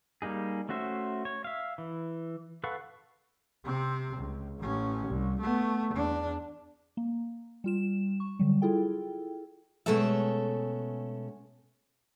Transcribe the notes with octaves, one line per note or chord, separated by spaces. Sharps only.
G3 A#3 D#4 G#4
A3 C#4 F#4 C5 E5
C#5
E5 F5
E3
A4 B4 F5 F#5 C#6
C3 C4
C#2
A1 C#4
C2
A3 B3
E2 D4
A#3
G3 F4 E7
C#6
D3 F#3 G3
E4 F4 G#4 A4 G5
B2 G#3 A3 C#4 A4 E5